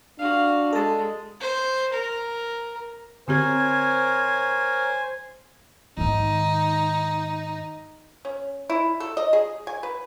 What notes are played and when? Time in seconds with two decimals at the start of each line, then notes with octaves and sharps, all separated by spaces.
0.19 D4 F#4 F5
0.73 G#3 A4 A5
1.41 C5
1.94 A#4
3.28 D3 C4 G4 A#4 C5 C#5 G#5
5.98 G#2 D#3 D#4
8.25 C#4
8.70 E4
9.00 A4
9.17 D#5
9.33 G#4
9.67 G#5
9.83 B4